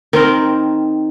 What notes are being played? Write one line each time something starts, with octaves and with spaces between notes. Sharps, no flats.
D#3 C4 A#4